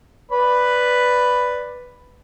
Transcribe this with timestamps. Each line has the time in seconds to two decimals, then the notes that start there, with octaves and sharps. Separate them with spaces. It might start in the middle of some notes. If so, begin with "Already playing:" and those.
0.32 B4 D5 B5